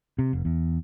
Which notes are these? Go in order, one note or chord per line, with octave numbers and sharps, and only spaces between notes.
C3
F1
E2